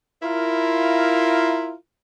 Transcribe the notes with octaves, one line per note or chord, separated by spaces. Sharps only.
E4 F4 A#4